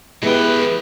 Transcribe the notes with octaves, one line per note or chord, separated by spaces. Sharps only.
E3 G#3 B3 E4 G4 B4 G5